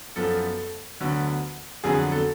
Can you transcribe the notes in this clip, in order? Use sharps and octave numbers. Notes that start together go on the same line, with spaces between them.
F#2 F3 B3 A4
D2 D3 F#3 B3
F2 D3 F#3 B3 G#4
A4